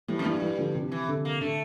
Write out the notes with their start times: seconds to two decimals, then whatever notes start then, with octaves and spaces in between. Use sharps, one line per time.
0.08 A2 E3 G3
0.19 F2
0.25 G2 E3 G3
0.41 E3 G3
0.58 D3 F3
0.75 C3
0.92 E3
1.08 D3
1.25 A#3
1.41 D3 A3